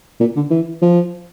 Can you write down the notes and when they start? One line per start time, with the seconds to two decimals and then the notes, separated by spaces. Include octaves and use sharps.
0.20 A#2
0.36 D3
0.50 E3
0.82 F3